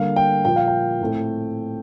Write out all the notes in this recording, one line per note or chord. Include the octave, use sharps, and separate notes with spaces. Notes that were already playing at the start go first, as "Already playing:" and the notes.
Already playing: D3 G3 A#3 F5
G5
A#2 F3 A#3 G5
F5
G5
A2 A3 C4